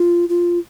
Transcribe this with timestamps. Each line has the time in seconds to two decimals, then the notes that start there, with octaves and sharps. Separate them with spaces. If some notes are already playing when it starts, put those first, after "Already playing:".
Already playing: F4
0.29 F4